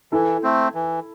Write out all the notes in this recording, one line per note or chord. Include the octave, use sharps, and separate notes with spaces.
E3 E4 A4
A3 C4
E3